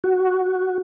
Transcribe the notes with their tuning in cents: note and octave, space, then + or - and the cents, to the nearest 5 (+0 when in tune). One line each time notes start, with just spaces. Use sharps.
F#4 +5